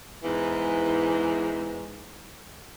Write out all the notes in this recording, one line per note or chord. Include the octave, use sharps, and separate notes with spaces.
E2 G#2 E3